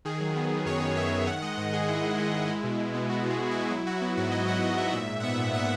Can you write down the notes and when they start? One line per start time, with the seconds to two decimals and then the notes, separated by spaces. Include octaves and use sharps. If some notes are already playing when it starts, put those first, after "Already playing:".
0.05 D#3 G#4
0.20 F#3
0.36 B3
0.51 F#3
0.66 F#2 C#5
0.81 B3
0.96 F#3 E5
1.11 F#3
1.27 D#3 F#5
1.42 G#3 D#5
1.57 G#2 F#5
1.73 G#3 G#4
1.88 G#2 E4
2.04 G#2
2.18 G#3
2.34 G#3
2.49 G#3
2.64 B2
2.79 B2
2.94 B3
3.09 B2 F#4
3.26 B2 G#4
3.40 B2
3.51 B2 E4
3.70 F#3 E4
3.86 F#3 F#4
4.01 B3 F#4
4.17 G#2 F#4
4.31 F#3 D#5
4.48 G#2 F#5
4.62 G#2 F#5
4.78 G#2 E5
4.93 A#2 E5
5.09 A#2
5.20 F#5
5.23 B3 E5
5.39 A#2
5.54 B3 F#5